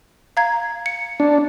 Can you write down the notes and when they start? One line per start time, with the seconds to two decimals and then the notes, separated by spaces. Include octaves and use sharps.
0.37 F5 A#5 G#6
0.86 C#7
1.20 D4